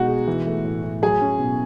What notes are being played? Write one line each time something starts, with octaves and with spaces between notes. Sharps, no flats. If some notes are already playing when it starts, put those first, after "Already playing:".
Already playing: B2 G#3 D#4 F#4
G#4
E3
A3
A2
A2
F#3 G#4
C#4
B2